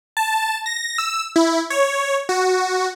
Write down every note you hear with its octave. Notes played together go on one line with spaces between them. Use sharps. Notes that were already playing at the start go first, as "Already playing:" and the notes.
A5
A#6
E6
E4
C#5
F#4